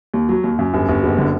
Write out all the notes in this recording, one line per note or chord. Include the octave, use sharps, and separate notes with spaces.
D#2
F#3
D#2
F#2
G1
G1
F#1
D3